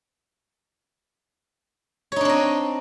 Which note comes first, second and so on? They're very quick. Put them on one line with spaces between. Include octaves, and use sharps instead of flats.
C#5 D#4 D4 C4 D#5